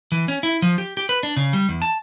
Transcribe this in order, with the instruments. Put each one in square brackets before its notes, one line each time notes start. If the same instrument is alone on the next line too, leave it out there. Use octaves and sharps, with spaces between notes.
[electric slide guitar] E3
C#4
E4
F3
G4
G4
B4
D4
C#3
G3
E2
A5